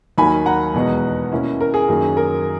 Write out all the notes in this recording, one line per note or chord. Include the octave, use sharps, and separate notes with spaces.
D#2 D#3 F#3 A#3 G#5 B5
F#5 A#5
E2 B2 G#3 B3
B2 A#3 C#4 E4
A#4
G#4
F#2 D#3 F#3 A#3
A#4